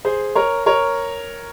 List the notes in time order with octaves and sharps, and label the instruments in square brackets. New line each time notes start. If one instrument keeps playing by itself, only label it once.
[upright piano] G#4 C5
A#4 C#5
A#4 C#5